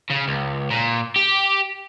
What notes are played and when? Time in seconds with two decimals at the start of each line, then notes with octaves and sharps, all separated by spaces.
0.10 C#3
0.28 C#2
0.71 A#2
1.16 G4